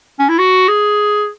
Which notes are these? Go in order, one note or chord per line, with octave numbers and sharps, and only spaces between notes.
C#4
E4
F#4
G#4